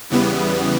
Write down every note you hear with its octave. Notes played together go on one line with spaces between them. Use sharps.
E2 C#3 E3 G3 B3